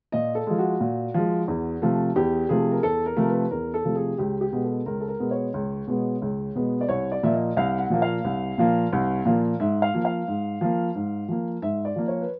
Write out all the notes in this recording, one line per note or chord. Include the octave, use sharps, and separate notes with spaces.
A#2 D#5
A4
F3 G#3
F#4
A#2
F3 G#3
E2
C3 F3 A3
E2 G4
C3 F3 A3 G#4
A#4
E2 A4
A#4
C3 F3 A3 A#4
B4
E2 A#4
A4
C3 F3 A3
G#4
C#2 G4
G4
B2 G#3 B3
A4
C#2 A#4
A4
A#4
B2 G#3 B3
C#5
C#2
B2 G#3 B3
C#2
B2 G#3 B3
D5
C2 C#5
D5
A#2 F3 A#3 E5
D#5
C2 F5
F#5
A#2 F3 A#3
F5
C2
A#2 F3 A#3
C2
A#2 F3 A#3
G#2 E5
F5
F3 A#3
F5
G#2
F3 A#3
G#2
F3 A#3
G#2 E5
D5
F3 A#3
C#5
B4